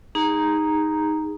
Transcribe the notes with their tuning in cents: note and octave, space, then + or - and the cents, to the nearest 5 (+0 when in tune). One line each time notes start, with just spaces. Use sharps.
D#4 +0 G#4 -25 A#5 +0